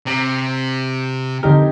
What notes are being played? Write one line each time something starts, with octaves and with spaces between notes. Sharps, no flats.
C3
F2 D3 D#4 G4 A#4